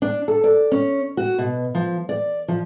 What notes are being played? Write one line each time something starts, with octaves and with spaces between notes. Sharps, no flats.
D4
A4
D5
C#4
F#4
B2
F3
D5
F3